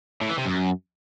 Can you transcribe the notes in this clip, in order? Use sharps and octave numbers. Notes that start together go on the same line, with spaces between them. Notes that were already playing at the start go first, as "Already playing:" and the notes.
A2
E3
C3
F#2